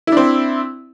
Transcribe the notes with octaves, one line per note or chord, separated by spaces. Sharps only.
C4 D4 E4